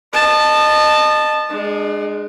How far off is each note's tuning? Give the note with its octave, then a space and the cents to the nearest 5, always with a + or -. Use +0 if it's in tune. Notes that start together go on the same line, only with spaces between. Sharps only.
D#5 -30 A5 +0
G#3 +0 D4 +35